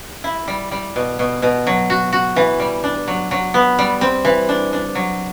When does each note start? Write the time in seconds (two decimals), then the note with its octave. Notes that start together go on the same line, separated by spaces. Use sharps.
0.24 E4
0.48 G3
0.71 G3
0.96 B2
1.19 B2
1.42 B2
1.67 F#3
1.90 F#4
2.12 F#4
2.36 E3
2.60 G3
2.84 D4
3.07 F#3
3.31 F#3
3.54 B3
3.79 G3
4.01 C4
4.25 E3
4.49 D4
4.73 D4
4.95 F#3